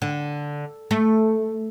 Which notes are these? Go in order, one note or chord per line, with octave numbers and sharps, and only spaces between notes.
D3
A3